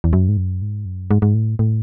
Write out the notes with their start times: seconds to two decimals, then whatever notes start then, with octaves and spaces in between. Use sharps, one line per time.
0.04 E2
0.13 F#2
0.29 G#2
0.37 F#2
0.62 G#2
0.85 F#2
1.11 G#2
1.22 G#2
1.34 A2
1.59 A2